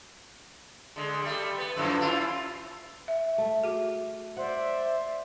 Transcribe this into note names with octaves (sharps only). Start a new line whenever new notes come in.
D3 G#3
G3 A3
B3
F#2 A2 F3
C#4 E4 F4
E5
A3
F#4 G#4
C5 D5 E5 F#5